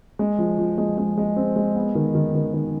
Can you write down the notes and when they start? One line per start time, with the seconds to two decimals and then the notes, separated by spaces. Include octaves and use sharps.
0.19 G#3
0.38 F3
0.58 F3
0.78 G#3
0.98 G#3
1.18 G#3
1.36 C4
1.56 G#3
1.76 B3
1.95 D#3
2.15 D#3
2.35 D#3
2.54 D#3